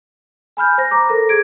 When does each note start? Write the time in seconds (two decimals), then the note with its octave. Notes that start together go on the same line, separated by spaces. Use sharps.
0.57 G#5 B5 F6 G6
0.78 C5 A#6
0.91 C5 A#5 D6
1.09 A4 A#4 A#6
1.29 G#4 G#6 D7